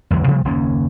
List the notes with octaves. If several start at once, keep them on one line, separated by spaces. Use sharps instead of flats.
A1 E2 D3 F#3
C3 F3 G3 A3
F#1 D#2 A#3 C#4